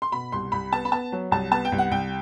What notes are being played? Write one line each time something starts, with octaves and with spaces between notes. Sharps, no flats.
C6
B2 B5
C2 C6
C2 B5
B3 A5
B5
B3 A5
F#3
C2 A5
B3 A5
G5
C2
F#5
C2 G5